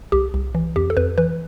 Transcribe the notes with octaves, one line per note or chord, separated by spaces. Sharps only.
C2 G4
C2
E3
F2 G4
A4
F2 B4
E3 B4